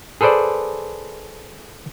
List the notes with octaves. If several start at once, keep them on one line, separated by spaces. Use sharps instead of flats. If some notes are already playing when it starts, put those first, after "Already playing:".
G#4 A4 B4 C5 D5